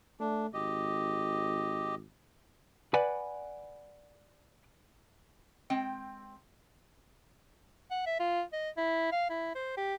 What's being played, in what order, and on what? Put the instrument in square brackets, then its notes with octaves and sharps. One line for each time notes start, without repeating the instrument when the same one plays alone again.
[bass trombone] A3 [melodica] D4
[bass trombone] G#1 [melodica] G4 D#5
[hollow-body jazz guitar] B4 D5 F#5 G#5 B5
[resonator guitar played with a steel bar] G#3 C4 G5
[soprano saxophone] F#5
E5
F4
D#5
E4
F5
E4
C5
G4